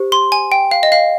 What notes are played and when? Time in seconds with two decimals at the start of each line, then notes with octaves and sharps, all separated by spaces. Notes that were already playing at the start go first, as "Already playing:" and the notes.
Already playing: G4 C5
0.12 C6
0.32 G#5
0.52 G5
0.71 F5
0.83 D#5
0.92 F5